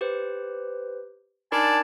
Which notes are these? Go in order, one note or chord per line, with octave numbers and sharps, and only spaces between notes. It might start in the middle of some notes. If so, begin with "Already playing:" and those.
G4 B4 C5
D4 D#4 A#4 D5 G#5 A5 B5